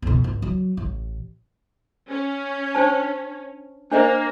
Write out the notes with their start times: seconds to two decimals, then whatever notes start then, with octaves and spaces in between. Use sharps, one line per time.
0.02 F2 B2
0.24 G#1
0.42 F#3
0.77 A1
2.09 C#4
2.75 D4 C5 A5
3.92 A#3 D4 C5 D#5